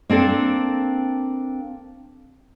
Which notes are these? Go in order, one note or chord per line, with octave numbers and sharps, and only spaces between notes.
A#3 C4 D4 A4